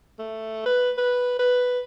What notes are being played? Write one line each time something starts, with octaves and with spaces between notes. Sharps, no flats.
A3
B4
B4
B4